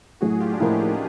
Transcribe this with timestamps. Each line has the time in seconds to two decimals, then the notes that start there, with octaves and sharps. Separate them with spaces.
0.21 A2 F#3 A3 F#4 G#4
0.40 F4 G4
0.53 D4
0.59 A2 F3 A#3 C#4 D#4